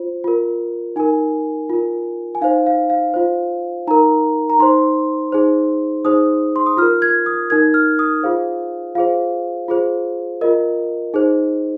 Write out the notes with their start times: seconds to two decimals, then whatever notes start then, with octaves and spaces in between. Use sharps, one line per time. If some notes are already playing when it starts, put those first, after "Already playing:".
Already playing: F4 C5
0.24 F4 A#4
0.96 D#4 A#4 G#5
1.70 F4 A#4
2.35 G#5
2.41 D#4 C5 F5
2.66 F5
2.90 F5
3.14 F4 C5
3.87 D#4 A#4 A#5
4.50 A#5
4.59 D#4 C5 C6
5.32 D#4 G#4 C5
6.05 D#4 G#4 C5 D#6
6.56 C6
6.66 D#6
6.77 F4 A#4 F6
7.02 G#6
7.26 D#6
7.50 D#4 A#4 G#6
7.74 F6
7.99 D#6
8.23 F4 G#4 C5 F5
8.95 F4 G#4 C5 F5
9.68 F4 G#4 C5
10.41 F4 A#4 D#5
11.14 D#4 G#4 C5